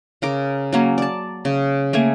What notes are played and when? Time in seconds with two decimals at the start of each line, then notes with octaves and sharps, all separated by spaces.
0.22 C#3 A#4 D6
0.73 F#3 A#3 C#4
0.98 D5 A5
1.45 C#3
1.93 A3 A#3 G#5